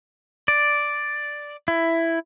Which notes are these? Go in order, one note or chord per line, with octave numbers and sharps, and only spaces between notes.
D5
E4